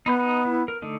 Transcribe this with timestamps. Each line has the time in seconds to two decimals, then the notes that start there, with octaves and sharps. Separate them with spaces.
0.06 B3 D#4 B5 G6
0.19 D#4
0.45 E4
0.68 A#4
0.82 D3 A3 D#4